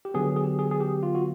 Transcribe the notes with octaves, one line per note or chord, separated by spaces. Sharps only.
G4
D3 F#3 B3 G#4
G#4
G4
G#4
G#4
G4
F4
F#4